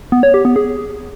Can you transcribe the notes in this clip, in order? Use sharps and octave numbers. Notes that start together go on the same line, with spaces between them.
B3
C#5
G4
B3
G#4